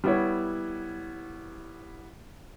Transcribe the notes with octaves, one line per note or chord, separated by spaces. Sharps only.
G3 B3 E4 C#5